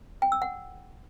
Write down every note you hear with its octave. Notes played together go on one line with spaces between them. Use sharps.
G5
E6
F#5